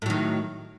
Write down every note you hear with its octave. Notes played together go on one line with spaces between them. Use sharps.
A2 D#3 F#3